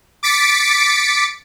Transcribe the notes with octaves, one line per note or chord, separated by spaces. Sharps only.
D6 A6 B6 C#7 D7